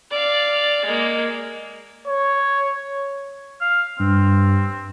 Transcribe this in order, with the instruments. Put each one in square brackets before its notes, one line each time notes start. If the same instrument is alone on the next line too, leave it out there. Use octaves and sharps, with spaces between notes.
[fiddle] D5 F5
G#3 A#3
[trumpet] C#5
[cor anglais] F5
[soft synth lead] G2 [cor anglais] C4